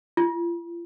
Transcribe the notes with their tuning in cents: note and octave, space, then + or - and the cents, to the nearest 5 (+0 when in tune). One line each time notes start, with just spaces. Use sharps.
F4 -45